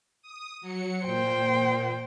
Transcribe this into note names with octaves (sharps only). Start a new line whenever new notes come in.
D#6
F#3 C#7
A#2 C5 G5